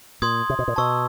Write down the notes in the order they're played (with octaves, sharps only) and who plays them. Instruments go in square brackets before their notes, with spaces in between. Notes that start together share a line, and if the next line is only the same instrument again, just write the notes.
[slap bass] A#2 [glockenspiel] C6 D#6 G#6
[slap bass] C3
B2
A#2
[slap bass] B2 [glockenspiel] A5 C#6 E6